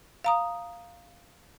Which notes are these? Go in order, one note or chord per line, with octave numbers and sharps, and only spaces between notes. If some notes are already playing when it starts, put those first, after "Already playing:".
F5 A#5 D#6